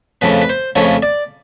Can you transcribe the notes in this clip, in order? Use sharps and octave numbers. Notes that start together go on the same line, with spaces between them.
F2 C#3 F3 A3 B4
B4
C5
F2 C#3 F3 A3 C#5
D5